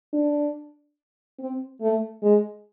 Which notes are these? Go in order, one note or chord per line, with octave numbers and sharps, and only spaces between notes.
D4
C4
A3
G#3